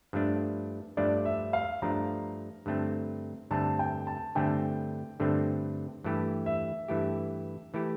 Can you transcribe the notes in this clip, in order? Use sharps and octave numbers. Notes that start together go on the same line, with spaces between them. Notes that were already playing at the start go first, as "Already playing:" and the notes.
G2 F3 A3 D4
G2 F3 A3 D4 D5
E5
F5
G2 F3 A3 D4 A#5
G2 D3 A3 C4
G2 D3 A3 C4 A5
G5
A5
G2 D3 A3 C4 G5
G2 D3 A3 C4
G2 E3 A3 E4 G4
E5
G2 E3 A3 E4 G4
E3 A3 E4 G4